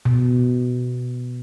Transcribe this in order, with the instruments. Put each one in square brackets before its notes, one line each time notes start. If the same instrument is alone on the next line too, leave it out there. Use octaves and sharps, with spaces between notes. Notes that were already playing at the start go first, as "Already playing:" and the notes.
[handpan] B2